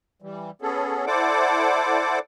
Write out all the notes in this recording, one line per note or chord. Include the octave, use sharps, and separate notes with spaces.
E3 G3
B3 C#4 G#4 A4
E4 A4 C5 D5 F#5 D6